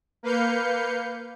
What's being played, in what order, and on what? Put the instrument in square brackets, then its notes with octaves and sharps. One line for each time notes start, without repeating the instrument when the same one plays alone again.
[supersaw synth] A#3 B4 F5 G6 C#7